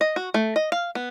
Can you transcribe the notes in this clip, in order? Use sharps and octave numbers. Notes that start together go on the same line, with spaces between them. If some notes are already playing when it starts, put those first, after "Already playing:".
D#5
F#4
A3
D#5
F5
B3